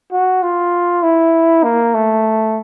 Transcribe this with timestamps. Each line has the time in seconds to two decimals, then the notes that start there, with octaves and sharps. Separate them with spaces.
0.12 F#4
0.42 F4
1.03 E4
1.64 A#3
1.94 A3